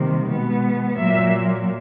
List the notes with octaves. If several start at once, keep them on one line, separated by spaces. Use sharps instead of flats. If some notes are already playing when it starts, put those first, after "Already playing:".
Already playing: C3 D#3 G3 A#3
B2 G#3 B3
A#2 F#3 A#3 E5